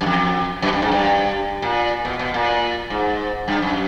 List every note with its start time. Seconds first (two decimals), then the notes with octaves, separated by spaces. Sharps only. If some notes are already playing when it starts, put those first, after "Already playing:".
0.01 F#2
0.06 F2
0.62 F#2
0.73 G2
0.82 G#2
0.92 G2
1.62 A#2
2.05 B2
2.19 B2
2.34 A#2
2.90 G#2
3.48 G2
3.62 F#2